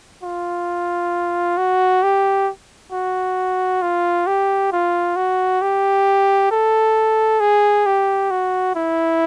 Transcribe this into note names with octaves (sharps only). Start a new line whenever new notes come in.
F4
F#4
G4
F#4
F4
G4
F4
F#4
G4
A4
G#4
G4
F#4
E4